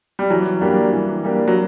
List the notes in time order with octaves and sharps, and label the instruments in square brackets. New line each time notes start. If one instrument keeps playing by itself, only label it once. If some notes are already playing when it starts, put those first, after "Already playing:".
[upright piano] G3
[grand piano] E3 [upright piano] F#3
[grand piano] G3 A#3 D4 G4
E3
G3 A#3 D4 G4
[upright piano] F#3